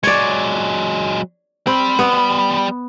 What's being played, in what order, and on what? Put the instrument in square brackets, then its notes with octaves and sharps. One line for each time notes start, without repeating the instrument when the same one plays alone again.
[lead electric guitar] F#3 G#3 [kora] C#5 D5
[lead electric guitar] G3 B5 [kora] C4
[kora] B3